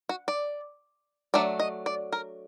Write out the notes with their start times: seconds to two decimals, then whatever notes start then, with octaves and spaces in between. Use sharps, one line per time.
0.09 F#4
0.28 D5
1.34 F#3 A3 D4 D5
1.59 D#5
1.86 D5
2.12 A#4